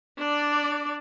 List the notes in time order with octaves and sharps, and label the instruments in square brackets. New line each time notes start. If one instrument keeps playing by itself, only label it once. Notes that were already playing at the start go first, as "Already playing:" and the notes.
[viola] D4 D5